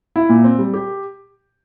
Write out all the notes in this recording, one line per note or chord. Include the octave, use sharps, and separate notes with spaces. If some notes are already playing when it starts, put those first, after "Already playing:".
E4
A#2
C4
G3
G4